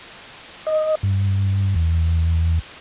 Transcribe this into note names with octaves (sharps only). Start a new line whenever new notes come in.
D#5
G2
E2